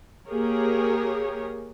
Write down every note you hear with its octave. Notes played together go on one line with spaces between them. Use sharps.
A#3 G4 G#4 A#4 C#5